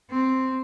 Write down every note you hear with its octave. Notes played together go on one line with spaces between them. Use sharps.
C4